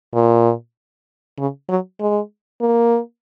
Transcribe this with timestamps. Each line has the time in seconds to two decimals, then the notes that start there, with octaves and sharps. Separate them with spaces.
0.14 A#2
1.38 C#3
1.68 F#3
2.00 G#3
2.61 A#3